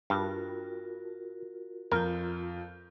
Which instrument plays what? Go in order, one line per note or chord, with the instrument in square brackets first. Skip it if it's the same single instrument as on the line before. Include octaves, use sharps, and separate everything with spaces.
[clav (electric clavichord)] G2 [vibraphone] F4 F#4 A#4
[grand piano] F2 G6 [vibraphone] F4 [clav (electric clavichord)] A#4